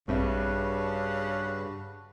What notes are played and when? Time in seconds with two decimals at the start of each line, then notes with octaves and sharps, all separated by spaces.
0.08 A#1 G2 C#3 C4 D4 F#4 B4 E5